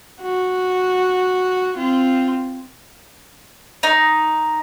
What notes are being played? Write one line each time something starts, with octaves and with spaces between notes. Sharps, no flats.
F#4
C4 F4
D#4